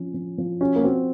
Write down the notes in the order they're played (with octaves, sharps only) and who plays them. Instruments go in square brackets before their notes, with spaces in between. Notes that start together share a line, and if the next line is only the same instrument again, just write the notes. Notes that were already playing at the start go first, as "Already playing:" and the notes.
Already playing: [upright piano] F3 C#4
F3
F3
[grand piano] C#4 [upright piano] F#4
[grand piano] A#3
[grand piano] C4 [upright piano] F#4